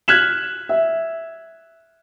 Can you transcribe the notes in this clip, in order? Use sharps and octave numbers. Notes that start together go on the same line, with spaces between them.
F6 F#6 G#6 B6 E7 F#7
E5